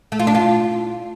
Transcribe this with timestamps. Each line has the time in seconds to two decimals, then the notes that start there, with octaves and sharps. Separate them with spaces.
0.12 A3
0.19 F4
0.27 D4
0.35 F4